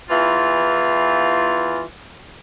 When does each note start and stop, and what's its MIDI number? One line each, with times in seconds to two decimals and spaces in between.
0.09 1.82 40
0.09 1.82 52
0.09 1.82 65